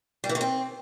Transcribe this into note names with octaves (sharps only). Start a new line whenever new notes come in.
G3
E3
D#3
C4